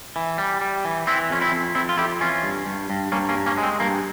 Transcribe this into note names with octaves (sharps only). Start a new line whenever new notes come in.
E3
G3
G3
E3
E3 C4 E4
F2 C#4
C4 E4
F2
F2 C4 E4
F4
F2 E4 G4
E3 C#4 F4
G2
G2
G2
G2 A#3 C#4
A#3 C#4
G2
A#3 C#4
G#3
C4
G2 A#3